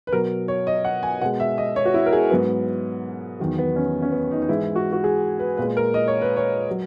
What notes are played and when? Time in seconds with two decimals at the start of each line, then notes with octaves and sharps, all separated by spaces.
0.07 B4
0.13 B2 F#3 A#4
0.48 C#5
0.67 D#5
0.85 F#5
1.03 G#5
1.21 B2 G#3 F#5
1.40 E5
1.58 D#5
1.76 C#5
1.85 F#4
1.94 E4
2.06 A#4
2.13 G#4
2.30 G#2 F#3 B3
3.40 E2 D#3 F#3
3.58 B3
3.76 C#4
4.02 C#4
4.12 B3
4.31 D#4
4.42 D#4
4.49 G#2 E3 G#3 E4
4.75 F#4
4.92 F#4
5.04 G#4
5.39 B4
5.57 A#2 G#3 B4
5.77 A#4
5.94 D#5
6.08 C#5
6.22 B4
6.36 C#5
6.71 F#3